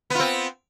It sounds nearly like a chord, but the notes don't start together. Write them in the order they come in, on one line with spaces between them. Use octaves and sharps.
B3 F4 C4